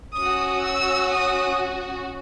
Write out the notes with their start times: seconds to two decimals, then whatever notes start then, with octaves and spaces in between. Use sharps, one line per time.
0.18 C#4 F#4 D#6
0.65 E6
1.12 D#6